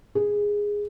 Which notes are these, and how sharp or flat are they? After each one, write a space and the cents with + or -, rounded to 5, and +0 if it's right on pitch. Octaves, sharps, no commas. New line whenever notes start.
G#4 -10